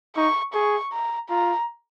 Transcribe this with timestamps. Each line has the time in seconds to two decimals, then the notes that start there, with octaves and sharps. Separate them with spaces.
0.16 D#4 C#6
0.54 G#4 C#6
0.93 A#5
1.30 F4 A#5